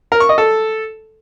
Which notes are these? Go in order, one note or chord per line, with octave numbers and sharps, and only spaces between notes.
A#4
C#6
D#5
A4